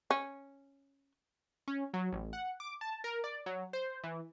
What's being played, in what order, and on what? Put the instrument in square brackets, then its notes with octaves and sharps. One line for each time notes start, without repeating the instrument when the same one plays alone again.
[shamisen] C#4
[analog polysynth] C#4
F#3
A1
F#5
D6
A5
A#4
D5
F#3
C5
E3